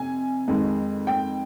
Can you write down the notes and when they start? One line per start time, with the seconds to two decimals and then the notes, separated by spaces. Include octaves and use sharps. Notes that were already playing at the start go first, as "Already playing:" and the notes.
Already playing: F2 C3 G#5
0.48 F2 D#3 G#3
1.07 G5